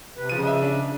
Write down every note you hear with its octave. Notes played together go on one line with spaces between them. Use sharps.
C3 B4
C#3 F3 D#7
D#5 E5
D4